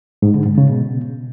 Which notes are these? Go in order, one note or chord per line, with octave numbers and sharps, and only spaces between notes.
G#2
D3
G#2
C#3
B2